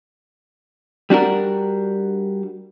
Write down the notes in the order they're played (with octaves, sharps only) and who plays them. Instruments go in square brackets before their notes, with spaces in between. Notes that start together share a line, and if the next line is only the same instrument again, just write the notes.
[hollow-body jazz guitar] G3 D4 F#4 A#4